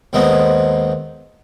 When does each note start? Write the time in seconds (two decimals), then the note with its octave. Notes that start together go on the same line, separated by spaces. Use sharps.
0.13 D#2 D#3 G#3 B3 C4